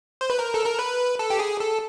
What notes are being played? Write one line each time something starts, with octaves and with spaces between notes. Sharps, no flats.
C5
B4
A#4
A4
A#4
B4
A4
G4
G#4
A4